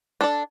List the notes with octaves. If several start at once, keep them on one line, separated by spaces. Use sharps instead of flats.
D4 A4 D5